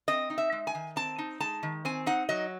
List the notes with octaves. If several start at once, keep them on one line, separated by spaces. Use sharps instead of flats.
C4 D#5
D#4
E5
G#3
G#5
D#3
C4 A5
D#4
G#3 A5
D#3
C4 G#5
D#4 F#5
F#3 D#5